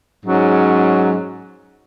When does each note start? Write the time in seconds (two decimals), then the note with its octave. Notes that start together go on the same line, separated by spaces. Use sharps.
0.24 G#2 F#3 C#4